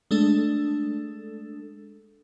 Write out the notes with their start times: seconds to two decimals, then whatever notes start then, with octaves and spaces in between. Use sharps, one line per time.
0.11 G#3 A3 D4 A4